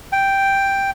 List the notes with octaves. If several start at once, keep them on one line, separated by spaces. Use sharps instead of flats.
G5